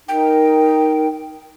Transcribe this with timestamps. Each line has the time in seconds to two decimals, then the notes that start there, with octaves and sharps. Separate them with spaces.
0.08 D#4 A#4 G5